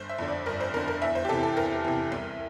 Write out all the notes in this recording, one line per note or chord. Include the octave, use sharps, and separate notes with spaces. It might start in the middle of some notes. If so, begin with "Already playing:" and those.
Already playing: G1 C5
E5
F2 D3
D5
G1 A#4
C5
F2 D3 A#4
A#4
E2 E5
C5
G4
C3 E3 A4
A4
E2 A#4
C3 E3
C2